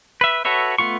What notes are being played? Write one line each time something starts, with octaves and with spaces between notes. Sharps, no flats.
B4 E5
F#4 A4 B4 C#5 E5
A3 B3 F4 C#6